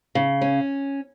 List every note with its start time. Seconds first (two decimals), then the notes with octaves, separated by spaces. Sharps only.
0.15 C#3
0.41 C#4